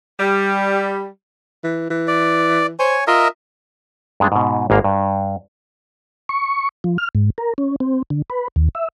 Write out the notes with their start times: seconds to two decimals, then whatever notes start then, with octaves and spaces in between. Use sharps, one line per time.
0.20 G3
1.64 E3
1.90 E3
2.08 D5
2.79 C5 C#5 G#5
3.07 F4 A#4 D#5 E5
4.20 G2 G#3 D4
4.32 G#2 B2
4.70 G#1 G#2 A#3 F5
4.84 G2
6.29 C#6
6.84 F3
6.98 F6
7.15 G#2
7.38 A#4
7.58 C#4
7.80 C4
8.10 D3
8.30 B4
8.56 D#2
8.75 E5